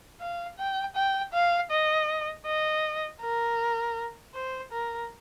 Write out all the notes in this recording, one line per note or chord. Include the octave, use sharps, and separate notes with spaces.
F5
G5
G5
F5
D#5
D#5
A#4
C5
A#4